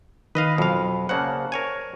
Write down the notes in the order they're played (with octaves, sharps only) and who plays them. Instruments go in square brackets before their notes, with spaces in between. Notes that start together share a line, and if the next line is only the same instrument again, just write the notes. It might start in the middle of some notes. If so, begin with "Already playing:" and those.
[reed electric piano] D#3 D#6 [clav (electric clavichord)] B4 D#5 F5
[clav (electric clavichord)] F2 F5 [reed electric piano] B2 F#3 B5
[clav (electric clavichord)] C#3 A#3 F#5 [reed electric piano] C5 D5 A5
[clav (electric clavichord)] A#4 C#5 G#5